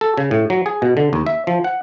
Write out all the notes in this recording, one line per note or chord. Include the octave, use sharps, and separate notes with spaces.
A4
C#3
A2
F#3
G#4
B2
D3
D#2
E5
F3
F#5